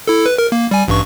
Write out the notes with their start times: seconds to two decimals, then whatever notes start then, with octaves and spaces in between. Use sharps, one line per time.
0.08 E4 A4
0.26 B4
0.38 A#4
0.52 A#3
0.71 G3 G#5
0.88 A1 G2 C#6